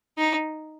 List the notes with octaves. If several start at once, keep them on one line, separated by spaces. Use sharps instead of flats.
D#4